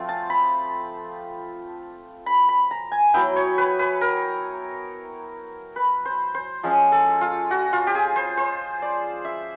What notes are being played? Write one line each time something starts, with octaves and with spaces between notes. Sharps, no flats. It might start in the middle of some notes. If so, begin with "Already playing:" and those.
Already playing: F3 A3 C4 F4
A5
B5
B5
B5
A#5
G#5
F#3 B3 E4 G5
C#5
B4
B4
A#4
B4
C5
C5
F3 G#3 C#4
A4
F4
F#4
F4
G4
G#4
C5
C5
D5
E5